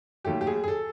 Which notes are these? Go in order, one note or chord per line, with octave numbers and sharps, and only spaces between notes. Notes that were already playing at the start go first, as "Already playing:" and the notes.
D#2 D#3 F#3 A3 G4
G4
G#4
G#4
A4